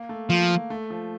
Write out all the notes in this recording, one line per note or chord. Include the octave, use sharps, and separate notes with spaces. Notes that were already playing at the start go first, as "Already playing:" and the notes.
Already playing: A#3
A3
F3 A#3
A3
F3